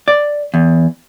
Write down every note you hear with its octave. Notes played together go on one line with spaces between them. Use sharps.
D5
E2